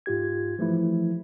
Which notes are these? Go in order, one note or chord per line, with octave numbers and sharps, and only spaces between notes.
G#2 F4 G4 G#6
E3 F3 A3 E4